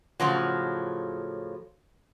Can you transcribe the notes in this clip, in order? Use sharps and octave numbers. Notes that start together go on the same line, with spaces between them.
A2 C#3 F3 F#3